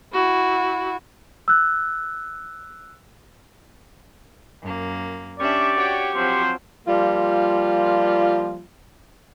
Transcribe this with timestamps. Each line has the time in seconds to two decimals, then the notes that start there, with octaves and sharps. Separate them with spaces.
0.13 E4 F#4
1.48 E6 F#6
4.63 F#2 A#3
5.39 C#4 D4 G4 D5 E5 C#6
5.76 F#4 C#5 G5
6.16 F3 F#3 C4 C5
6.87 F3 G3 A#3 F4